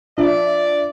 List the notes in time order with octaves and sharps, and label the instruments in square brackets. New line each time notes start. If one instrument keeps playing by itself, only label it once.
[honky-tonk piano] F3 D4 E5 [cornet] D5